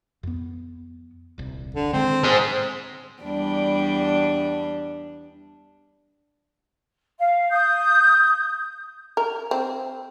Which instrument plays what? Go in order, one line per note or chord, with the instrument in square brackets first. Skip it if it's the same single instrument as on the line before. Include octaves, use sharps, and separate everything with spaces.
[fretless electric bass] F2 B3
D#1 C2
[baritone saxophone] D3
[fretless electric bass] D3 D#3 G#3 [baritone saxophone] C4
[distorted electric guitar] G#3 C5
[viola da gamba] E2 G3 D4
[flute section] F5
D#6 G6
[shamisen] A#4
C4